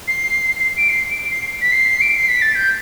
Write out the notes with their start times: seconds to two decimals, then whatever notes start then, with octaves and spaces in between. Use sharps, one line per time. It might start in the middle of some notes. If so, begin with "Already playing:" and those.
0.08 C7
0.77 D7
0.89 C7
1.10 D7
1.31 C7
1.61 B6
1.72 C7
2.01 D7
2.15 C7
2.28 B6
2.42 A6
2.55 G6